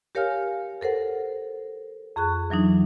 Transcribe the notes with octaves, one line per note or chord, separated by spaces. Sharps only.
G4 A#4 C#5 F5 G#5 F6
A4 A#4 C5 F#5
F2 G#4 C#6 F#6
E3 F#3 D4 D#4